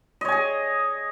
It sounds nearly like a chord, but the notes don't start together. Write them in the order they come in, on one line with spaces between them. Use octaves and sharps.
D#5 C#5 G#5 G#4